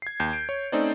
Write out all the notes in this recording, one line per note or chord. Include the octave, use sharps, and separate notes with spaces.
G#6 C7
D#2 G6 C7
D7
C#5
A3 C4 C#4 D#4 C5 D5